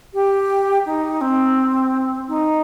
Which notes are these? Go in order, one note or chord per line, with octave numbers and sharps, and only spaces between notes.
G4
D#4
C4
D#4